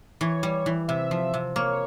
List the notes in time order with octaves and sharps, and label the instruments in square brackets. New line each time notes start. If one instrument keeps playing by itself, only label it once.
[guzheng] E3 [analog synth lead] C#5
[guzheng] G3
E3
[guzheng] C3 [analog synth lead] E5
[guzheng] F3
C3
[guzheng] A#3 [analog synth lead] C#5